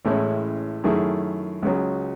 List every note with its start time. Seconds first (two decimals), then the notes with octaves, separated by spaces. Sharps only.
0.05 A1 A2 G#3 C#4 E4
0.84 F#2 D#3 A3 E4 G#4
1.63 C#2 C#3 F#3